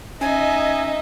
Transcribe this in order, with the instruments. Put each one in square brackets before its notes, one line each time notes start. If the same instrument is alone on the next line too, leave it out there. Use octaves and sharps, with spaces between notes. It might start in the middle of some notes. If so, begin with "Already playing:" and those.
[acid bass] C#4 [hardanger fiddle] D#4 [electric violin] D#5 E5 [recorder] G#5